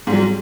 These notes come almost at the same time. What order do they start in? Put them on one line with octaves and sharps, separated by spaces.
G#2 G3 F#3